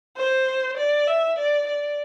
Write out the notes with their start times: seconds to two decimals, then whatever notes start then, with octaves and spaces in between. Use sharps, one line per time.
0.17 C5
0.77 D5
1.08 E5
1.39 D5
1.68 D5